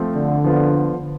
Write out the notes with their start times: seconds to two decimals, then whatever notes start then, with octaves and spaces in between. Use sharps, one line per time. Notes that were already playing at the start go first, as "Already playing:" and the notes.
Already playing: F3 A3 C4
0.14 D3
0.44 F3 B3 F4